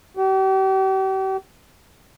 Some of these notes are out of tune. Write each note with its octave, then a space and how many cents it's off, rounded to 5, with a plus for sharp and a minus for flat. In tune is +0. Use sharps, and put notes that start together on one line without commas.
G4 -40